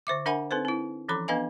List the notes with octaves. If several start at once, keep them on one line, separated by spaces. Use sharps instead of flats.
D3 C5 E5 D6
D4 A#4 E5 F#5 G#5 B5
C4 D#4 A4 B4 C5
C4 E4
E3 F3 C#4 A4 B5 D6
B3 D4 B4 D#5 F5 G#5